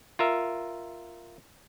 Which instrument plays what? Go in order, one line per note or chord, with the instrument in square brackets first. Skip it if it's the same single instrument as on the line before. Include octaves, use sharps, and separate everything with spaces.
[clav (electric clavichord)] F4 A#4 E5